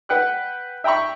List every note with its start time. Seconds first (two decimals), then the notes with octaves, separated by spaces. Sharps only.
0.09 B4 F#5 G5 F#6
0.84 E5 G5 A#5 B5 C#6